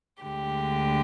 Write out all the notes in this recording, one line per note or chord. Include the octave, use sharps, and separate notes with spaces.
D2 D3 G#3 G4